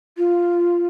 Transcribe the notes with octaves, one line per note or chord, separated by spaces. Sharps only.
F4